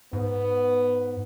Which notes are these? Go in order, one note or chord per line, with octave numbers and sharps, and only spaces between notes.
G#2 B3